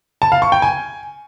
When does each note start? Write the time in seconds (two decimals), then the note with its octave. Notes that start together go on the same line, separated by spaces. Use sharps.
0.22 A5
0.32 F5
0.42 C#6
0.52 G5
0.62 G#5